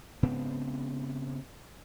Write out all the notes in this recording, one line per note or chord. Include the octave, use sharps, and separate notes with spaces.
G#2 C#3 B3 C4